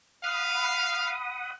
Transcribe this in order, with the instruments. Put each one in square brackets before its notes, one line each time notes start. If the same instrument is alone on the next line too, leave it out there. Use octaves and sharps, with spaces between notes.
[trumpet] F5 [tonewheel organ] F#5 B5 D#6